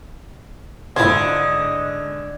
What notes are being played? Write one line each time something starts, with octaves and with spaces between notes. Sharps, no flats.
G#2 D3 E4 F4 C5 D#5 G#6